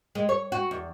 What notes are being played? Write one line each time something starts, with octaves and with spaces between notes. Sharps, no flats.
G#3
C#5
F#4
E2